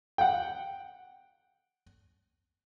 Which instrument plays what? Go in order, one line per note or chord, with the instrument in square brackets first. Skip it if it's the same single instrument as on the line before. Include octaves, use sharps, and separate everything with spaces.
[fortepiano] F#5 G5